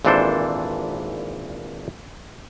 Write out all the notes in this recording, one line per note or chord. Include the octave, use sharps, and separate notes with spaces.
G#1 A#2 E3 D4 A4 C5